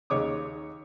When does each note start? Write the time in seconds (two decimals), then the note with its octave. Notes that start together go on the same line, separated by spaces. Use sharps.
0.10 D#2 C#3 C#5 D6 D#6